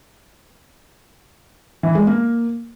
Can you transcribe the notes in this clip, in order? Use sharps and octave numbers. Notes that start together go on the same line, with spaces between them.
E3
G#3
A#3